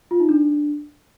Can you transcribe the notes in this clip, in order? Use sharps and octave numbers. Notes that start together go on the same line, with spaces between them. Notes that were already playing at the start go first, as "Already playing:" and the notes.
F4
D#4
D4